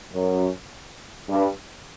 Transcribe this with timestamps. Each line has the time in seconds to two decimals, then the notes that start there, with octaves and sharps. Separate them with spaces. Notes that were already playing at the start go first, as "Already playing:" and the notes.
0.13 F#2
1.29 G2